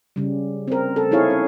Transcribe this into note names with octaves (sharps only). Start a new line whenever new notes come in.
C#3 G3
C4 A#4
A4
C4 D#4 E4 G#4 C#5 F5
C#4